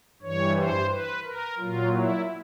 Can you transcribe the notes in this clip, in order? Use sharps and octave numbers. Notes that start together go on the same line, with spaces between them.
G2 E3 G3 C#5
C5
B4
A#4
A#2 F#3 F4
E4